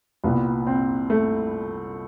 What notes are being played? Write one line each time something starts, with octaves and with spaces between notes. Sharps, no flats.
C2 A#2 G3 B3
C4
A3